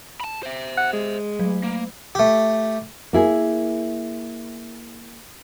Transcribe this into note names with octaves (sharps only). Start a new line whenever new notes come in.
A5 B5
C5 E5
F#5
G#3
F#3 A3
A#3
A3 G4
A#3 E4 G#4